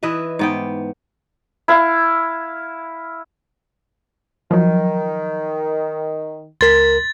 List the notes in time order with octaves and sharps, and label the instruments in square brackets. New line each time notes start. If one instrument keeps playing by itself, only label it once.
[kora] E3 B4 D#5 E5
G#2 B3 G5
[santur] E4 F5
[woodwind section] D#3 [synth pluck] F3 F#3
[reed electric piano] C#2 A#4 [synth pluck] C6 G#6 B6 [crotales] A6